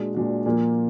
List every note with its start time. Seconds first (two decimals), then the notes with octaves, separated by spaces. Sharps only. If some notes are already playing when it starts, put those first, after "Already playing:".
Already playing: A#2 G#3 D4 F#4
0.15 A#2 G#3 D4 F#4
0.46 A#2 F3 A#3